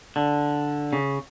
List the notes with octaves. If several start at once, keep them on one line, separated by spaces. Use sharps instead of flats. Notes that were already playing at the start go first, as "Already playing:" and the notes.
D3
C#3